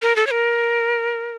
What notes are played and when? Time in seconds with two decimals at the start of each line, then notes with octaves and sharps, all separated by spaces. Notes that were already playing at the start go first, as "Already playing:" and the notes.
0.02 A#4
0.16 A4
0.27 C#5
0.31 A#4